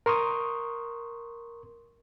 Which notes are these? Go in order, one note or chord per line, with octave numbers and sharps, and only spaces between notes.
A#4 C6 C#6 D#6